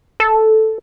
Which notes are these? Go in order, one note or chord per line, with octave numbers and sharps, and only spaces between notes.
A4